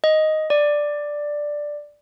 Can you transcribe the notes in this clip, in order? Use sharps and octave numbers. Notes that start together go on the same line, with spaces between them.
D#5
D5